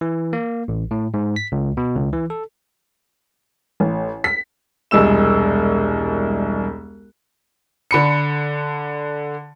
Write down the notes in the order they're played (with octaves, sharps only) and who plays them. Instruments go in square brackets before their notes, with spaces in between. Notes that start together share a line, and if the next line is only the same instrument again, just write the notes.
[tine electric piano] E3
A#3
A1
A2
G#2
B6
C#2
B2
C#2
E3
A4
[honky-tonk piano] A1
B6
[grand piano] E1 C2 G#3 E6 E7
D3 B5 C#7